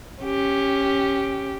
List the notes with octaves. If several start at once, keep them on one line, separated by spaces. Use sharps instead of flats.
C#4 G4